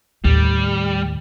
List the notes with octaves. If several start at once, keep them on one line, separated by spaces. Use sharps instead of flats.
D#2 A2 G3